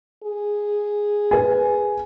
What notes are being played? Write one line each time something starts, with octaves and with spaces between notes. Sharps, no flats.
G#4
B4 G#5